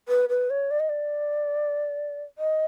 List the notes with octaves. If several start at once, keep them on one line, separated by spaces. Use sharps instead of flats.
B4
B4
C#5
D5
D#5
D5
D#5